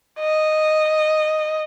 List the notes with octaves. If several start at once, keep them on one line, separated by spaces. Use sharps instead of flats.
D#5